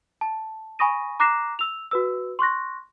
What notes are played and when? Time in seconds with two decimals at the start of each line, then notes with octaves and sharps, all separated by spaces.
0.21 A5
0.79 G#5 B5 C#6 D#6 A#6 D#7
1.20 A#5 D6 F#6 A#6 C7 E7
1.59 E6 F7
1.91 F#4 B4 E6
2.39 C6 C#6 F#6 A#6